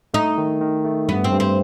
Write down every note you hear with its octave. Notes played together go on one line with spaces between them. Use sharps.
A3 D#4
D#3
D#3
A3
G2 B3
C4
G2
C4